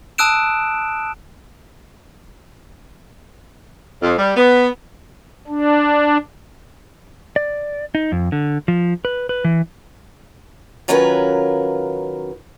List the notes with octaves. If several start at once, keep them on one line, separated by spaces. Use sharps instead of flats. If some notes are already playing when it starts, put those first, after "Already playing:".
A5 D#6 E6 F#6 D7 E7
F2
G3
B3
D4
D5
D#4
F2
D3
F3
B4
B4
E3
D#3 F#3 C#4 F4 A#4 B4